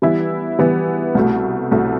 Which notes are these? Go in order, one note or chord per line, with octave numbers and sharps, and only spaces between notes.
E3 G3 B3 E4
E3 G3 B3 E4
C2 B2 A3
C2 B2 A3